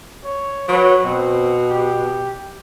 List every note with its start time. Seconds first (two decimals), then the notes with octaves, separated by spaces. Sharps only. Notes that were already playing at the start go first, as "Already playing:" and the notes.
0.25 C#5
0.69 F#3 B4
1.04 B2 C4
1.71 G4